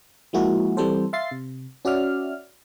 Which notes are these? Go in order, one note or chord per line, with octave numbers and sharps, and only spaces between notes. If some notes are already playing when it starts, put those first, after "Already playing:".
F3 G#3 A#3 E4 F#4 G#4
E3 G3 C4 A4 C5
E5 F5 C6 A6 C7
C3
C#4 F#4 D5 E5 F6